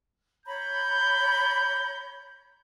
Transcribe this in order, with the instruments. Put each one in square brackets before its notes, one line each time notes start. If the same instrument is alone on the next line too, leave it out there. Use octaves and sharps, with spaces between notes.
[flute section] C#5 A#5 B5 [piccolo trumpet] G6